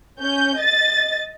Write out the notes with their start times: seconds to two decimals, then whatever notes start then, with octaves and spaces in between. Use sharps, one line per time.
0.20 C#4 G6
0.58 D#5 A6